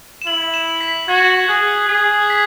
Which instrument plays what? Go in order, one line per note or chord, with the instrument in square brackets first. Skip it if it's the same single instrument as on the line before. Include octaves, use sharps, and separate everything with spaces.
[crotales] E7
[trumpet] E4 [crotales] F#7
[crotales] E7
B6
B6
[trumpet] F#4 [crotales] G#6
[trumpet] G#4 [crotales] F#6
[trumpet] G#4 [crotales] G#6
[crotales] B6